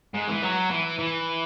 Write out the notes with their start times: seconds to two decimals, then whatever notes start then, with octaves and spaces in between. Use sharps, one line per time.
0.14 G#2
0.29 E3
0.43 F#3
0.71 E3
0.99 E3